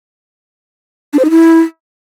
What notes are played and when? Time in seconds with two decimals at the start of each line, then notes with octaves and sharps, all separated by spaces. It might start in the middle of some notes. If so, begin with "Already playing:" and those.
1.13 D4
1.19 C5
1.25 D#4
1.30 E4